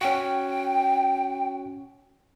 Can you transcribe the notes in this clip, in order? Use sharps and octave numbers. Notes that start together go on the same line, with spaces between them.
C#4 F#4 G5